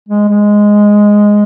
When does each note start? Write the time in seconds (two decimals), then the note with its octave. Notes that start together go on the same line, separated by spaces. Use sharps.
0.09 G#3
0.28 G#3